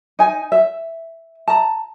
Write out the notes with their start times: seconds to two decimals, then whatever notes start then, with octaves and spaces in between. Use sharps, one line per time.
0.19 D#4 G#5
0.52 E5
1.47 A5 A#5